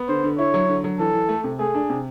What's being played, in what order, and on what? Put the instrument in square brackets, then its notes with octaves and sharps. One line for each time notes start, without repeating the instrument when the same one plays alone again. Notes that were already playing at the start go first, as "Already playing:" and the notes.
Already playing: [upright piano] B3
[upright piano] D3 [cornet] C5
[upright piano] D3
[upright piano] E4 [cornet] C#5
[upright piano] F#3
D3
F#3
[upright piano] E3 [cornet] A4
[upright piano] E3
A3
C3
[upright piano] A3 [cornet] G#4
[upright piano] D4
C3